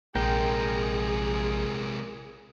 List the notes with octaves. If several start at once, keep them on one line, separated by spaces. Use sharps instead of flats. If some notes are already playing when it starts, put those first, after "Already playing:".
A#1 C3 G#3 G#4 A#4 G5